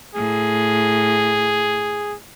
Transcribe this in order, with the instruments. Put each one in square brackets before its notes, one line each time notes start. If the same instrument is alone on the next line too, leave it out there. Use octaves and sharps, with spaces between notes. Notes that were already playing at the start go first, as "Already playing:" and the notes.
[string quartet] A2 [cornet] G#4